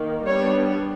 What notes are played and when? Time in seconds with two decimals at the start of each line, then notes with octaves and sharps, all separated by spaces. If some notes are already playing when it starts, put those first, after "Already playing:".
Already playing: D#3 A#3
0.26 G3 B3 D4 C#5